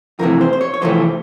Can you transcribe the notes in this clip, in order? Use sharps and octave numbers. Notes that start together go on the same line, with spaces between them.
F2 C3 E3 A3 A#4
C5
C5
C#5
C#5
F2 C3 E3 A3 C5